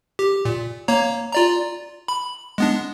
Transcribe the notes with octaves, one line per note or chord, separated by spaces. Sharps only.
G4
A#2
A#3 C#5 A#5
F4 D5 A#5
B5
G#3 B3 D4